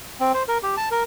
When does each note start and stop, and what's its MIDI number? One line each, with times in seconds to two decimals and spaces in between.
0.20 0.32 60
0.34 0.43 72
0.48 0.58 70
0.63 0.75 67
0.77 0.89 81
0.91 1.03 70